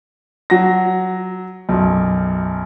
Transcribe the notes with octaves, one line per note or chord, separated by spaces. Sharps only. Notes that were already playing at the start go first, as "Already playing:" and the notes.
F#3 A#6
B1 F#2